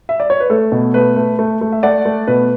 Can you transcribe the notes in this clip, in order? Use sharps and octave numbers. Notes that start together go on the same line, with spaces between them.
E5
D5
C#5
B4
A3 A4
B2
A3 B4
A3
A3
A3
E5
A3 D5 F#5
A3
B2 B4